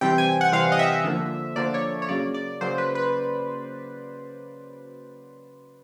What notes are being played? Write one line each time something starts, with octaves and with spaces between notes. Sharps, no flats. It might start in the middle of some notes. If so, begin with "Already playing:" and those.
C3 E3 G3 C4 G5
G#5
F#5
C3 E3 G3 C4 F5
D#5
E5
D3 F3 A#3
D3 F3 A#3 D5
C#5
C#5
C#3 F#3 A#3 D5
D5
C#3 F#3 A#3 C5
B4
B4